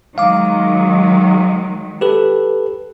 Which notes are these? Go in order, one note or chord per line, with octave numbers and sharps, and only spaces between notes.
D#3 F#3 G#3 F5 D6
G4 A4 B4